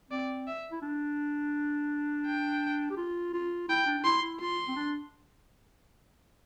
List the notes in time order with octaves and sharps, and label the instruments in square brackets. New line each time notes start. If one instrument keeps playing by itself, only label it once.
[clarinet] C4 [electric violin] D5
[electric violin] E5
[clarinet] E4
D4
[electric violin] G5
[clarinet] G4
F4
F4
[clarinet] E4 [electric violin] G5
[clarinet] D4
D4
[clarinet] E4 [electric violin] C6
[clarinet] E4
[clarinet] F4 [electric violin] C6
[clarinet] C4
D4